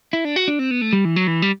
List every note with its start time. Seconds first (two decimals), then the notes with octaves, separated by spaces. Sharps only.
0.13 E4
0.25 D4
0.36 F#4
0.48 D4
0.59 C4
0.71 B3
0.81 A3
0.93 G3
1.05 E3
1.16 F#3
1.27 E3
1.42 G3